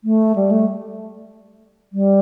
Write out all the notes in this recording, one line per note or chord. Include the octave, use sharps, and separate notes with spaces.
A3
G3
A3
G3